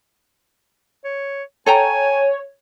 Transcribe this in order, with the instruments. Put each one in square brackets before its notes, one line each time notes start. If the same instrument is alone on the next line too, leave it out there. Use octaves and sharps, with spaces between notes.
[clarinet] C#5
[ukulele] A4 G5 A#5 [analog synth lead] C#5 [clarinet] G#5